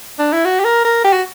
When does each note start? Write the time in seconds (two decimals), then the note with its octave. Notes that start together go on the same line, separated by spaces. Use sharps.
0.19 D4
0.33 E4
0.45 F#4
0.60 G4
0.64 A#4
0.85 A#4
1.04 G4
1.13 F#4